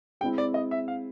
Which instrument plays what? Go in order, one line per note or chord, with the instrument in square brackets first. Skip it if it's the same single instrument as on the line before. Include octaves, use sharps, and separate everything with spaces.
[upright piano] G#3 [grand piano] G5
[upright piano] C4 E4
[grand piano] D5
D#5
E5
F5